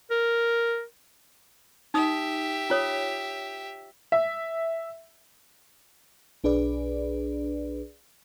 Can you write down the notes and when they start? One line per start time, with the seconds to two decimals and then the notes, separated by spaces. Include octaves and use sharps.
0.10 A#4
1.94 D#4 G4 E5 D#6
2.70 F4 C#5 D#6
4.12 E5
6.44 B1 D4 G#4 B4 D5